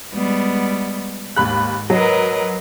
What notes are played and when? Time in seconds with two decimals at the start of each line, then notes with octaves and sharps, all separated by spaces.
0.14 G3 G#3 B3
1.36 D#2 G#2 B5 F#6
1.90 F#3 A#4 B4 D#5